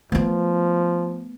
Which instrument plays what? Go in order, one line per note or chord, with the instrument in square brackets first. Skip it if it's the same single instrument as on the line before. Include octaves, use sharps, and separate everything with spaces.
[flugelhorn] F3 [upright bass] A3 B3